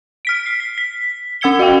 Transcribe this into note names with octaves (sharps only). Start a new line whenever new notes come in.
F6 B6 D7
C7
B6
B6
C#4 F#5 E6 G#6 C#7 G7
F#4 F5 G5